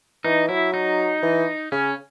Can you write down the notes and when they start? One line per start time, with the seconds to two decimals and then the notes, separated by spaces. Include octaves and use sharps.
0.24 E3 D#4
0.49 F#3 E4
0.74 D#4
1.23 E3
1.72 C#3 C#4